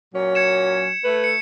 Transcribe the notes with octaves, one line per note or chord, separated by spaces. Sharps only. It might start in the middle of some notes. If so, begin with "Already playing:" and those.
A#2 F#3 C#4 C#5
G#6 C#7 E7
A3 B4
C#7